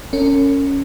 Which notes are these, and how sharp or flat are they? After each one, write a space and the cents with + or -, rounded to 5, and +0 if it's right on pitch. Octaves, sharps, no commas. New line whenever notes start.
C#4 +0 A#4 -45